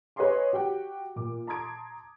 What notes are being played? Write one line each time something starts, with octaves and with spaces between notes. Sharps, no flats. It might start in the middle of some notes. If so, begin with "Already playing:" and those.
B4 C#5 D#5 G#5 C6 D6
F#4 G4 F#5 G5
A#2 D6
A5 A#5 C6 D#6 G#6 D7